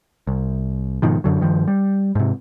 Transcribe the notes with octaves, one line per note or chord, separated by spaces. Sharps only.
C2
G#2 B2 D#3 F3
F#2 D3 F#3
G2 D#3 F3
G3
G#2 C3